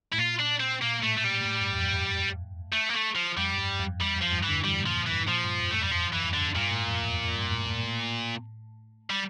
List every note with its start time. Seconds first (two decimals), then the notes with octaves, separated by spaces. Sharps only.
0.12 A2 E4
0.18 A#2 F4
0.39 D4
0.60 C4
0.82 A#2 A#3
1.03 A2 A3
1.17 A3
1.24 A#2 G3
1.41 A#2
1.46 A2
1.61 G2
1.72 E2
1.78 F2
1.94 F2
2.73 A3
2.90 A#3
2.94 A3
3.15 F3
3.37 F2 G3
3.54 F2
3.58 G2
3.79 F2
4.00 E2 G3
4.16 F2
4.22 F3
4.33 G2
4.43 E3
4.49 D3
4.64 E3 G3
4.81 A#2
4.86 F3
5.07 E3
5.12 G2
5.28 A#2 F3
5.44 G2
5.60 F2
5.71 E2 A3
5.82 G3
5.92 F2 F3
6.13 F2 E3
6.24 G2
6.34 D3
6.41 E2
6.48 F2
6.55 G2 A#2
6.71 A2
6.88 F2
7.03 E2
7.19 F2
7.36 G2
7.51 A2
7.67 A2
7.83 A2
9.10 G3